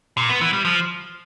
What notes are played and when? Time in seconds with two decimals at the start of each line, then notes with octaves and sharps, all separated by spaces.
0.17 A#2
0.29 B3
0.41 E3
0.53 G3
0.65 F3